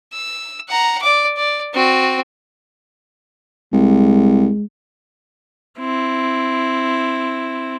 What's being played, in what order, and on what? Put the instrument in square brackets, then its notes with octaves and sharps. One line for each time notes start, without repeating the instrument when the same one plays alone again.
[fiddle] E6
F#5 A#5
D5 D6
D5
C4 F#4
[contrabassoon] C2 [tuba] G#3
[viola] C4 E4